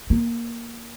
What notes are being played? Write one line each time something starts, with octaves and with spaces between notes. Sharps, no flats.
A#3